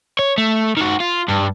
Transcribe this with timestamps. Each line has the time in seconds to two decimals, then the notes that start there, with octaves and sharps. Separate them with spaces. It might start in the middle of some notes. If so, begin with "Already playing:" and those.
0.19 C#5
0.38 A3
0.77 D#3 F#4
1.00 F4
1.28 G2